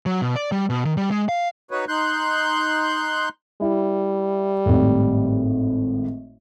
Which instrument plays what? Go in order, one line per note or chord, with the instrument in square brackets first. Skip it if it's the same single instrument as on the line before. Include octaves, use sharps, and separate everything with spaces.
[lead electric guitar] F#3
B2
D5
G3
B2
D#3
G3
G#3
F5
[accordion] D#4 F#4 B4 C#5
D#4 C6 F#6 G6
[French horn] G3 [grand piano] E4
[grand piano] G#1 A2